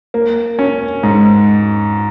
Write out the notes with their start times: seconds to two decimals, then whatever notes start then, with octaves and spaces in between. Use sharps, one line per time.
0.14 A#3
0.59 C#4
1.03 G#2